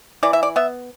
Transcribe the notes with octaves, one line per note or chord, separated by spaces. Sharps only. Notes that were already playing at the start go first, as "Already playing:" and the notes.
E3 D5
E5
D5
B3 E5